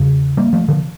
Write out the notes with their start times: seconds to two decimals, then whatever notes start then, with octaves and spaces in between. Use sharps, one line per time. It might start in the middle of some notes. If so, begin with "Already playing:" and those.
Already playing: E2 C#3
0.37 G3 A#3
0.53 F3 A3
0.68 D3 F3